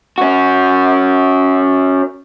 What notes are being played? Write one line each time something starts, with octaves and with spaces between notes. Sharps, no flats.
C#4 F#4